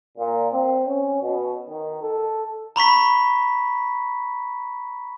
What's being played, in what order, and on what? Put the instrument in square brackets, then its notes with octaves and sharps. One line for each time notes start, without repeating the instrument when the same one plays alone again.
[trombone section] A#2
C4
C#4
B2
D#3
A4
[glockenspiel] A#5 B5 C#6 B6